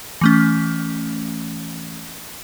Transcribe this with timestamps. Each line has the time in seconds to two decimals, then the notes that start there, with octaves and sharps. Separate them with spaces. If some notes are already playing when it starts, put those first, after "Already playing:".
0.21 E3 A3 C#4